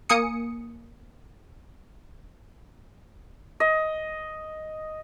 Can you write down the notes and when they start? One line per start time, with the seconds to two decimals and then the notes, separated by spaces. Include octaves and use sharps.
0.09 A#3 G#5 D#6 C#7
3.60 D#5